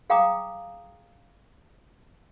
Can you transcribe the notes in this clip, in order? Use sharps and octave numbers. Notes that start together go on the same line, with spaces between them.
G#4 F5 G5 A#5 D6 D#6